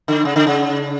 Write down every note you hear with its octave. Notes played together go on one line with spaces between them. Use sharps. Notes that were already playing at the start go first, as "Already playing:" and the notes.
D3
C#3
D3
C#3